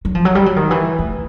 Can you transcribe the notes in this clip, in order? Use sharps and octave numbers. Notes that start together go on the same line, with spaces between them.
F#3
F3
F#3
G3
F#3
D#3
E3
A3